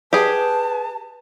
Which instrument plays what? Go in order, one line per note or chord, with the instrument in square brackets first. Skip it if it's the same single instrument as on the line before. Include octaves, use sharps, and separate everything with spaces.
[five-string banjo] G4 G#4 [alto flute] B4 [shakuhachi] A5